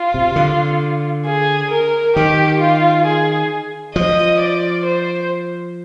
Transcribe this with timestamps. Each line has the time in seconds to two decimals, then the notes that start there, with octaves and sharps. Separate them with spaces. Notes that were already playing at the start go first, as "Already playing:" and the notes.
Already playing: F4
0.14 C3
0.36 D3
1.26 G#4
1.71 A#4
2.16 D#3 G4
2.60 F4
3.06 G#4
3.96 F3 D#5
4.41 D5
4.86 C5